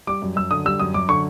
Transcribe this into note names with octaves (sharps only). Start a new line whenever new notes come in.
G3 D6
F#2
F#2 E6
D3 D#6
G3 E6
F#2 D#6
F#2 D6
D3 C#6